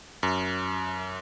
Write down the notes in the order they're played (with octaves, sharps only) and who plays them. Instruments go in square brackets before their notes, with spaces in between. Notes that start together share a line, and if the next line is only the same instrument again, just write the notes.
[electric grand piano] F#2